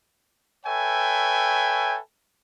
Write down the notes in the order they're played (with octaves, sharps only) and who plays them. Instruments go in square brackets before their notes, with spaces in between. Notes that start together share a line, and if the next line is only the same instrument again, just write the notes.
[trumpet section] A4 B4 C#5 E5 G5 G#5